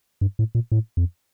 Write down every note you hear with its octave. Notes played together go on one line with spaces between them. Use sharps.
G2
A2
A#2
A2
F2